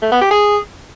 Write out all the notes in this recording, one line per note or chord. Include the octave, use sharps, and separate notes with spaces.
A3
B3
G4
G#4